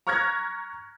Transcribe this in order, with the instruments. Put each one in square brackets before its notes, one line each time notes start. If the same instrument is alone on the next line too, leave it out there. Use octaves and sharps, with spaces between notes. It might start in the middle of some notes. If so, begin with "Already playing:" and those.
[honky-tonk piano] A#5 C#6 F6 F#6 G#6 A#6